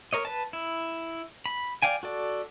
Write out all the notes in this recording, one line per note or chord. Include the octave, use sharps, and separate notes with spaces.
A#4 C#5 D#5
B4 A5
E4
B5
D5 F5 G5 G#5
F#4 A4 D5